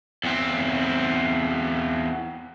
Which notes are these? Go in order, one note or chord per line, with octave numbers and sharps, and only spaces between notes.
E2 C4